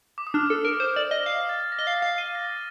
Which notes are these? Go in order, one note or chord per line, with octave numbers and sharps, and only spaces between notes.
D6
D#6
D4 F6
A4
A#4
C5
D5
D#5
F5 F6
A6
A#6
D#5
F5
A#6
F5
D#7 G7
A#6
A6